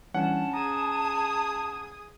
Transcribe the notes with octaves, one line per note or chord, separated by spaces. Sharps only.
E3 G3 C#4 D4 F#5 A5
G#4 A#5 D#6